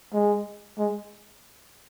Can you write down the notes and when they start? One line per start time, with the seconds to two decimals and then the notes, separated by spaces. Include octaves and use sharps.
0.14 G#3
0.78 G#3